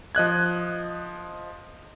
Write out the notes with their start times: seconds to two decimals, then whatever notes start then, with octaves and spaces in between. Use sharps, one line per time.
0.15 F3 D#5 F#6 G#6